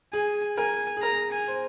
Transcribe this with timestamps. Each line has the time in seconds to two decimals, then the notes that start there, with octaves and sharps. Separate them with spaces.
0.13 G#4 G#5
0.57 A#4 G#5
0.97 G#4
1.02 A#4 A#5
1.32 G#5
1.48 C5